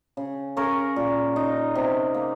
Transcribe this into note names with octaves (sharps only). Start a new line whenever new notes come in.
C#3
C#3 A#4 C#5
A#2
D#4
C3
A#3